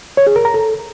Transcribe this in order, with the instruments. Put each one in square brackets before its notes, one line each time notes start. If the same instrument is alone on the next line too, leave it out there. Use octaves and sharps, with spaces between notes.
[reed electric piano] C#5
G#4
A#4
A#5
A4